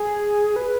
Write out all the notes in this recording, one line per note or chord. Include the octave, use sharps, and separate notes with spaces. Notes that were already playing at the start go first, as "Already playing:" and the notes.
Already playing: G#4
B4